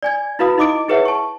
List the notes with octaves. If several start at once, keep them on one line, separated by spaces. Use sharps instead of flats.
D5 G#5 G#6
E4 F#4 B4 F5 B5 D#6
D#4 E4 D#5 D6 D#6 D7
E4 G#4 B4 C#5 E5 F#5
A5 C#6